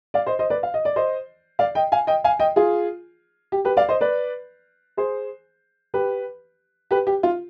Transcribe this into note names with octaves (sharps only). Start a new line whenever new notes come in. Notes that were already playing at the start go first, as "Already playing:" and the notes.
D5 F5
C5 D#5
C5 D#5
B4 D5
F5
D#5
D5
C5 D#5
D5 F5
D#5 G5
F5 G#5
D#5 G5
F5 G#5
D#5 G5
F4 G#4
G4
G4 B4
D5 F5
C5 D#5
B4 D5
G#4 C5
G4 B4
G4 B4
G4
F4